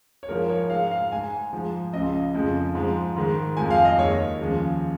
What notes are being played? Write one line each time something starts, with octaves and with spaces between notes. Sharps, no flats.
C#5
G#2 F3 G#3 A#4
C#5
G#2 G#3 F5
F5
G#2 G#3 G#5
G#2 F3 G#3
C#2 C#3 F3 D#5
F2 C#3 F3 G#3
G#2 F3 G#3
G#2 D#3 G#3
F2 F3 G#3 G#5
F5
D#5
D#2 D#3 G#3 C#5
D#2 C#3 F3 G#3